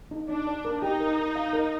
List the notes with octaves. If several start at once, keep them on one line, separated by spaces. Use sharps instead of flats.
D#4
D4 D#4
D5
A#4
D#4 G4
A#4
A#4
F5
A#4